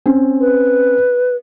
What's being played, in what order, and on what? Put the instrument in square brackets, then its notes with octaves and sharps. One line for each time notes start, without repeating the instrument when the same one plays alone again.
[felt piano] C4 C#4
[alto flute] B4